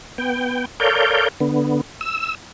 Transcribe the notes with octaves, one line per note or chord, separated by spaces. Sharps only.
B3 G5
A4 A#4 C#5 D5 F5 G6
D3 B3
E6